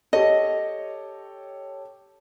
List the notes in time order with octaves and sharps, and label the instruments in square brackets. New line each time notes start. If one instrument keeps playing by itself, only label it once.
[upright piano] G4 A4 C#5 [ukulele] D#5